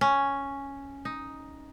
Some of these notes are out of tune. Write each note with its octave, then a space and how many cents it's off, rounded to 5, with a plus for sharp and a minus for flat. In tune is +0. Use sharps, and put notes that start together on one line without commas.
C#4 +0
D#4 +5